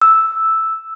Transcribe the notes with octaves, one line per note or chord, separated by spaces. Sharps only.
E6